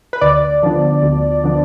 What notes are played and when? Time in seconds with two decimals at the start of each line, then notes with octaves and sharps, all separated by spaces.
0.13 B4
0.21 D2 D5
0.62 D3 F3 B3 D4
1.03 D2
1.44 D3 F3 B3 D4